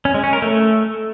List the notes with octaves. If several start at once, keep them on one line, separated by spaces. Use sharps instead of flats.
C#4
G#3
C#4
A#4
A3